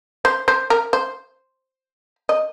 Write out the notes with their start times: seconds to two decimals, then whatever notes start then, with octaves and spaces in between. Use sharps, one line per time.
0.25 C5
0.48 C5
0.70 A#4
0.93 C5
2.29 D#5